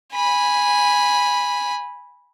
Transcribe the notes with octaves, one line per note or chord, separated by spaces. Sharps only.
G#5 B5